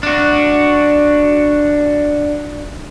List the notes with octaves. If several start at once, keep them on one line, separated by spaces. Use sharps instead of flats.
D4 F#4